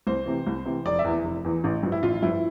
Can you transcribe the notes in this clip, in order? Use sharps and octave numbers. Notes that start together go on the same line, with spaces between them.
C2 C5
C3 E3
C2
C3 E3
F1 D5
E5
E2 E3
F1
E2 E3
A1
G2 F3
E4
A1 F4
G2 F3 E4